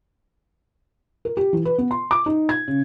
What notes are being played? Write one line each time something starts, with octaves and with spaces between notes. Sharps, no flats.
A#4
G4
E3
B4
B3
C6
D6
D#4
G#6
C#3